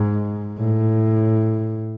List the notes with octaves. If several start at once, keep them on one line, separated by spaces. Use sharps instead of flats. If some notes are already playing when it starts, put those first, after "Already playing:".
Already playing: G#2
A2